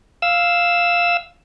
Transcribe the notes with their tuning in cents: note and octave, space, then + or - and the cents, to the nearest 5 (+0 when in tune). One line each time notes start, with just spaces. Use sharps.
F5 +0 E6 +0